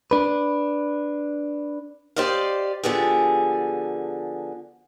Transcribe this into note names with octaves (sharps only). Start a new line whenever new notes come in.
D4 B4
G4 C5 D5 D#5 F5
D3 F3 B3 G4 G#4